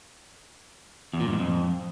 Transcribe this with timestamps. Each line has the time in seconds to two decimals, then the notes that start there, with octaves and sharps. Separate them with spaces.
1.13 E2
1.20 A#2
1.26 G2
1.33 G#2
1.39 F2